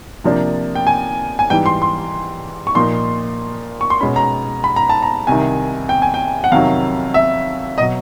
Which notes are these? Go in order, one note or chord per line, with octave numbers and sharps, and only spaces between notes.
C3 F3 A#3 D4
G5
G#5
G#5
G#2 E3 G3 G5
C6
C6
C#6
A#2 F3 A#3 D#4 C6
C#6
C6
B2 G#3 C#4 B5
A#5
B5
A#5
A5
A#5
C2 C3 D#3 G#5
G5
G#5
G5
F#5
F2 C3 D#3 F#3 F5
E5
B2 F#3 D#5